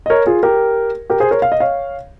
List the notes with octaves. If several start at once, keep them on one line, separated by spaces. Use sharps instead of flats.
D#5
A#4 C#5
F4 G#4
G4 A#4
G4 A#4
G#4 C5
A#4 C#5
F5
D#5
C#5 F5